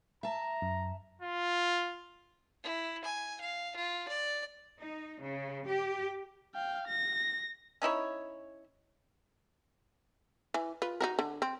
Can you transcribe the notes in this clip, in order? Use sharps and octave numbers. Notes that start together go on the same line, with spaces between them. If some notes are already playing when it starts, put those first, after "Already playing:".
E5 A5 A#5
F#2
F4
E4
G#5
F5
F4
D5
D#4
C#3
G4
F5 G5
A#6
C#4 D#4 E4 C#5
E3
F4 B4
D#4 F#4 A#4
D3
C4